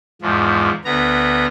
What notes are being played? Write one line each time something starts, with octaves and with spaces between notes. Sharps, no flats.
E2 G#2 F3
D2 B3 A#5